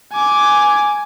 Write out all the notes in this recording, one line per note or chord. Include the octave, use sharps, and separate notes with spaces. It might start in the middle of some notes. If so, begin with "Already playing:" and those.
G#5 D6